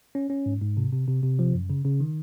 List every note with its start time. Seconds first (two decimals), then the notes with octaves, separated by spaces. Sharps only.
0.15 C#4
0.30 C#4
0.46 G#2
0.61 G#2
0.77 C3
0.92 C3
1.08 C3
1.23 C3
1.39 F3
1.54 F#2
1.70 C#3
1.85 C#3
2.00 D#3